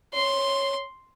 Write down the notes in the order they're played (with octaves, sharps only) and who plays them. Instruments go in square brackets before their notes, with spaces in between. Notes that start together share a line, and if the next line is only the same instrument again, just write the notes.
[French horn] C#5 [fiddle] C6